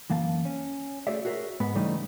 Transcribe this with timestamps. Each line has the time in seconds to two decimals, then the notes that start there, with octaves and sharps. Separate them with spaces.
0.10 F#2 E3 A#3 F5 A5
0.45 C#4
1.07 A3 F#4 G#4 C#5 D5 E5
1.25 F#4 G#4 A#4 C5 C#5 E5
1.60 G#2 B3 B4
1.75 C#3 E3 G3 A3 C#4 D#4